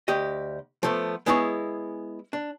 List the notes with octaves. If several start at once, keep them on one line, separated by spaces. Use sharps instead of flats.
D2 G4 D#5
F3 A3 B3
G#3 B3 E4 G#4 B4 C#5
D4